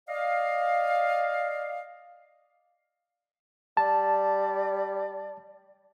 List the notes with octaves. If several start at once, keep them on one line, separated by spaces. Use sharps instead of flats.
D5 D#5 F5
G3 D5 A5